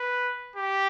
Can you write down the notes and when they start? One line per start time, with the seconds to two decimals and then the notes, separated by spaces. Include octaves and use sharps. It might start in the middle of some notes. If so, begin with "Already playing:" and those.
Already playing: B4
0.56 G4